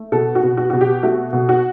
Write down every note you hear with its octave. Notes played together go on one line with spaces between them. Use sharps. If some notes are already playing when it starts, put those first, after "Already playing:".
Already playing: A3
B2 A4
F#4
B2
F#4
B2 F#4
G4
A3 F#4
B2
F#4